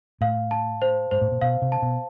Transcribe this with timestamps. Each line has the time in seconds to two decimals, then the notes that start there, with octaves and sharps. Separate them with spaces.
0.21 A2 F5
0.51 A5
0.82 C5
1.11 G#2 C5
1.21 A2
1.32 A#2
1.41 B2 F5
1.62 C3
1.72 A5
1.82 B2